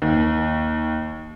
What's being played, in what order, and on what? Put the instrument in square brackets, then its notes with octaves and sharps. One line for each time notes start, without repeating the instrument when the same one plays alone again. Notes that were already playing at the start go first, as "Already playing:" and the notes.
[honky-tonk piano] D#2